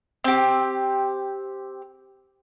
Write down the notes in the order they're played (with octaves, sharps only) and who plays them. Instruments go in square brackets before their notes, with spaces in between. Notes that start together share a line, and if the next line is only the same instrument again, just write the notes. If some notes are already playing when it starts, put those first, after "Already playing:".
[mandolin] C4 G4